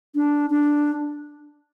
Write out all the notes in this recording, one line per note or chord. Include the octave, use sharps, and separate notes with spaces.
D4
D4